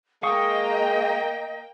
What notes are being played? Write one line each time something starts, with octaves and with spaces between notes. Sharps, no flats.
G#3 A#3 D#5 F5 G5 C#6 D#6